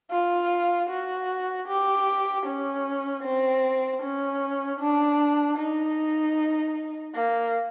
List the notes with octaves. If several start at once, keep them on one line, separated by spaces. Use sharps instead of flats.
F4
F#4
G4
C#4
C4
C#4
D4
D#4
A#3